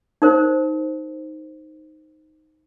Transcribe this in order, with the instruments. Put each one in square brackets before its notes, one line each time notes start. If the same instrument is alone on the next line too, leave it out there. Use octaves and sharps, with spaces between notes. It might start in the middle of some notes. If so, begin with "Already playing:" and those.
[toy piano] D#4 A#4 C5